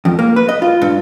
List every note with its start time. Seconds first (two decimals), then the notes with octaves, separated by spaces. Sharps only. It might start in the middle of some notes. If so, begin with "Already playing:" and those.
0.05 F2
0.19 A#3
0.36 B4
0.49 D#5
0.62 F4
0.82 G2